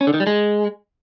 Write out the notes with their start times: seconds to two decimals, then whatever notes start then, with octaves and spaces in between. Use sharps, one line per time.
0.01 C#4
0.07 D3
0.14 D#3
0.20 G3
0.27 G#3